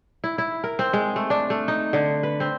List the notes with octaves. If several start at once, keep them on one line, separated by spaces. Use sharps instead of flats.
E4
E4
A#4
C4
G#3
A3
D4
A3
D#4
D3
B4
C4